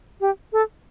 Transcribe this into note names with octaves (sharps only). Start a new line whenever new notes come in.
G4
A4